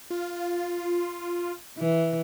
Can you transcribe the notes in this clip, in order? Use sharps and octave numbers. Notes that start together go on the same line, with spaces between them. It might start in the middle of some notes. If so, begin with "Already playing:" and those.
F4
E3